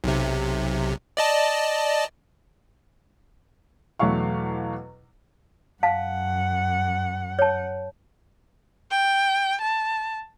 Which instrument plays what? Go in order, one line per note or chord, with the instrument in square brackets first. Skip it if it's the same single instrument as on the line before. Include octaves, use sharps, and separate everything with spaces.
[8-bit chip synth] B1 C3
D5 D#5 A5
[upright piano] E2 B2 F#3 A3 F5 C#6
[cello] F#2 F#5 [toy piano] F5 A5
[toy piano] C#5 A5
[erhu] G5
A5